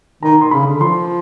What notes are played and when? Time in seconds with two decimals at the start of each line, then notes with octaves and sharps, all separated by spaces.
0.22 D#3 A#5
0.41 C6
0.51 C#3 B5
0.66 D3
0.81 F3 C6